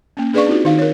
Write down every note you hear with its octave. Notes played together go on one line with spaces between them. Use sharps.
A#3 C#4
D4 G#4 B4 D5 F5 C#6
C4 D#4 F4 F#4
D#3 D#4 F5
A#4 C#5